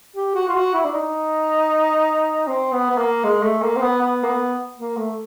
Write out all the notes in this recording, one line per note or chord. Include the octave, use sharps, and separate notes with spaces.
G4
F#4
F4
F#4
E4
D4
D#4
C4
B3
B3
A#3
G#3
A3
A#3
C4
B3
B3
A#3
B3
A#3
A3